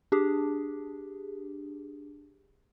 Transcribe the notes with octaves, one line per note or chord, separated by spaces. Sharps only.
D4 G4 G#4